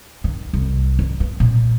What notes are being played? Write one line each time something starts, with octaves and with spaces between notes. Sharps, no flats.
D#3
C2
D#3
B3
A#2